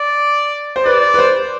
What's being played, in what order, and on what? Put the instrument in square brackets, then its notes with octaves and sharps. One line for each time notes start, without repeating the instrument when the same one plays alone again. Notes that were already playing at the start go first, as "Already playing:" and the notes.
Already playing: [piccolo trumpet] D5
[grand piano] C5
[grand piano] B4 [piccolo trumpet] D5
[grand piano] B4
C5